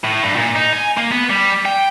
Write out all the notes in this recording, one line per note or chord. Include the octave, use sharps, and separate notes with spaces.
A2
G2
A#2
D#4
G#5
A#3
B3
G3
G5